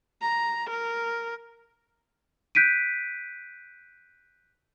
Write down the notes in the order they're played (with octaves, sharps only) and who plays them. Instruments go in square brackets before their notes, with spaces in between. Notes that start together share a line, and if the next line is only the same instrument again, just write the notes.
[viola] A#5
A#4
[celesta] F#6 G6 B6 D7 D#7